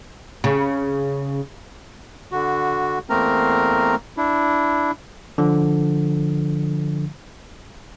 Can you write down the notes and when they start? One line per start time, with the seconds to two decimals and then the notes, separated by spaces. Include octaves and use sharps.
0.44 C#3
2.31 D3 F#4
3.10 E2 A3 A#3 C4 A#4 A#5
4.17 D4 E4
5.38 D3 F3